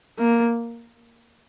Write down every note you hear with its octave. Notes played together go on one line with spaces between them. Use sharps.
A#3